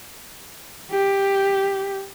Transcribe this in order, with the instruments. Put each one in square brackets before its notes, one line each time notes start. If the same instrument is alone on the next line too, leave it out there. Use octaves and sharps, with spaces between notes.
[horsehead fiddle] G4